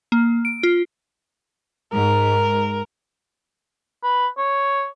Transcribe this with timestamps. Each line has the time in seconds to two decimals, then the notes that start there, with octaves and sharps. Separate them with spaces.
0.12 A#3
0.45 D7
0.63 F4
1.93 G#2 A#4
4.03 B4
4.37 C#5